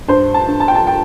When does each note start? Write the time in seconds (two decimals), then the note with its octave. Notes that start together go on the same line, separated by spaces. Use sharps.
0.08 G2 C5
0.34 A5
0.48 G2
0.60 A5
0.68 G5
0.75 A5
0.87 G5